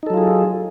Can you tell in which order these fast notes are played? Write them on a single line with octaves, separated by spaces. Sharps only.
D#4 A4 F#3 F4 G#4